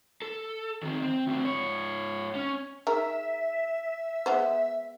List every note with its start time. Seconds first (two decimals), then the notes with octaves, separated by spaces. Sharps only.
0.22 A4
0.83 D#3 C4
1.02 C4
1.27 D2 C4
1.44 G#2 C#5
2.35 C#4
2.87 D#3 G#4 A#4 E5
4.26 G#3 B3 C5